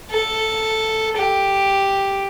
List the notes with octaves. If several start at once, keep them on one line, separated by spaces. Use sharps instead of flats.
A4
G4